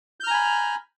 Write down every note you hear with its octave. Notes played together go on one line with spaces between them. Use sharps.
G#5 A#5 B5 F6 G6